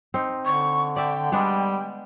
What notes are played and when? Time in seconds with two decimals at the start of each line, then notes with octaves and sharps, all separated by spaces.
0.14 C4 D#4
0.45 D3 C#6
0.96 D5 E5 G5
1.32 G3 G#3 B3 D4